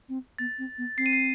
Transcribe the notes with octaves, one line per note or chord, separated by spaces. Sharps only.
C4
B3 A6
C4
B3
C4 C7
D#7
C7